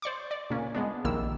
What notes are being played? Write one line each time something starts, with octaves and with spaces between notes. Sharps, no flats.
C5 D5 C#6 D6
D5
A#2 C#3 A#3 C#4
G#3 B3 D4
A#1 C3 D#3 A#3 E4 E6